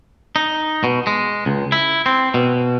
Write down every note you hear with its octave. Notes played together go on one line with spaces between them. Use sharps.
D#4
B2
G#3
C#2
E4
C4
B2